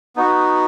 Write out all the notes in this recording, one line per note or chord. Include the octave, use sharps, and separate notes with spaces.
B3 D#4 F#4